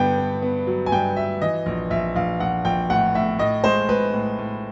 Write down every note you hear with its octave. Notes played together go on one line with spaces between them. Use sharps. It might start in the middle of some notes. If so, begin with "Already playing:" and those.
Already playing: G2 D3 B3 G5
B3
B3
F#3
G#5
G2 G5
F#3 E5
E3 D#5
A#1
A#1 E5
A#1 F5
A#1 F#5
A#1 G5
A2 F#5
A2 E5
A2 D#5
G#3 C5
G#3 B4
A2
A2